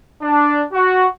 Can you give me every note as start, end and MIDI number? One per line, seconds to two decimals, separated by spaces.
0.22 0.62 62
0.73 1.06 66